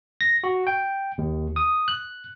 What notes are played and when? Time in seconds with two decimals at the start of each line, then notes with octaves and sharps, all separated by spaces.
0.21 A#6
0.44 F#4
0.67 G5
1.18 D#2
1.56 D#6
1.88 F#6